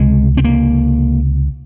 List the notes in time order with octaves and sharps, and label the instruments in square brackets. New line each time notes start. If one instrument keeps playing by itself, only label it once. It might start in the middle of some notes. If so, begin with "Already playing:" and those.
Already playing: [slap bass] C#2 C3 G#3
C4
A#3